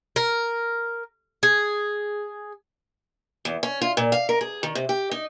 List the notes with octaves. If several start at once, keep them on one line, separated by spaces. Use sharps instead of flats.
A#4
G#4
E2
C#4
F4
A#2
F5
A#4
G#4
D#3
C3
G4
D#4